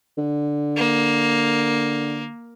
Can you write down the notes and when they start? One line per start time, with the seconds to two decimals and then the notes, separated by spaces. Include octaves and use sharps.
0.17 D3
0.76 A#3